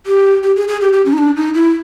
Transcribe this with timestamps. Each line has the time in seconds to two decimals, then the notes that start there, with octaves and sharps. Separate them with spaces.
0.06 G4
0.43 G4
0.57 G#4
0.68 G#4
0.81 G4
0.93 G4
1.06 C#4
1.13 D#4
1.18 D4
1.37 D#4
1.54 E4